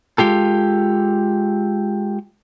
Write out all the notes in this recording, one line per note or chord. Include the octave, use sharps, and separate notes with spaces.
G#3 F4 G4 A4